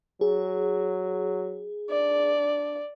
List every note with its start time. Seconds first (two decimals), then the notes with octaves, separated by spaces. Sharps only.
0.21 F#3 G#4
1.90 D4 D5